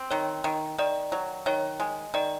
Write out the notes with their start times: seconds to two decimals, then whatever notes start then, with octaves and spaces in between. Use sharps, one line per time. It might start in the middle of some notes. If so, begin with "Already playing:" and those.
Already playing: C4
0.11 D#3 C#5
0.44 D#3
0.78 D#3 D5
1.12 F#3
1.46 D#3 C#5
1.80 G#3
2.14 D#3 D5